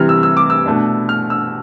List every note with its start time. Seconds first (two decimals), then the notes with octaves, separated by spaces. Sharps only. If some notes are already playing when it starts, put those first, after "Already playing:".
Already playing: C3 E3 G3 F6
0.09 E6
0.23 E6
0.37 D6
0.50 E6
0.66 B2 A3 D4
1.09 F6
1.30 E6